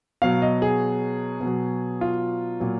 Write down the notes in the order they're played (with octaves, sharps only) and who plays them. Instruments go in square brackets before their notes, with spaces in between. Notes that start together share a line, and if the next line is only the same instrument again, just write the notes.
[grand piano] B2 F#3 F5
D#5
G#4
B2
F#3
F4
A#2 F#3